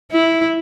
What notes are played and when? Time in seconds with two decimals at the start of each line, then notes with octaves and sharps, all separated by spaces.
0.12 E4